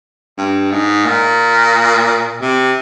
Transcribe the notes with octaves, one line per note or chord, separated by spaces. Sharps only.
G2
G#2
A#2
C3